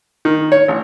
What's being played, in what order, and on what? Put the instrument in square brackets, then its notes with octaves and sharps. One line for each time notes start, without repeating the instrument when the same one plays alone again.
[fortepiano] D#3
C#5
A1